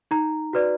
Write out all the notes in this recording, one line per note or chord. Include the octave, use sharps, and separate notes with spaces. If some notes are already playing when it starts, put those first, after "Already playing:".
D#4 A#5
F#4 B4 D5